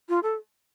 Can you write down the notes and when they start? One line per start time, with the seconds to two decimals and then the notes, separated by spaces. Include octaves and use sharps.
0.09 F4
0.23 A4